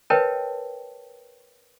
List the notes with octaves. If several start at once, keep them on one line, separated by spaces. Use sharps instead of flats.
A#4 B4 C#5 D#5 G5 A5